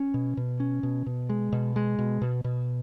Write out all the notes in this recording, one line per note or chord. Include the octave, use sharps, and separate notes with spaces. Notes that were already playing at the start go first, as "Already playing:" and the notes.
Already playing: C#4
B2
B2
C#4
B2
B2
G#3
B2
G#3
B2
B2
B2